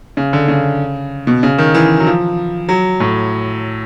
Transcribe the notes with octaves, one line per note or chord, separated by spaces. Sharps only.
C#3
D3
C#3
B2
C#3
D#3
E3
F#3
F3
F#3
A2